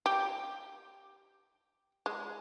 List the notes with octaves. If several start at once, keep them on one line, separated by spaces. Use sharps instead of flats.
G4
G#3